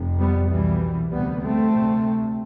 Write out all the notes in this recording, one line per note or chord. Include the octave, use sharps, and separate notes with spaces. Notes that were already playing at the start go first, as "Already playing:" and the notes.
Already playing: F1 F2 C3
G3 B3
C2 B2 E3 G3
D2 C3 G3 B3
A3 C4
D2 C3